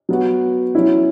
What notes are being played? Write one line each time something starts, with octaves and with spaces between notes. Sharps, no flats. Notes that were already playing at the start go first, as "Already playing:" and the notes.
F#3 B3 F#4
F#3 C#4 E4